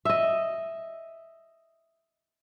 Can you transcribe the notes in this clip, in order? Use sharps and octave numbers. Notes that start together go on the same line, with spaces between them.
D#5 E5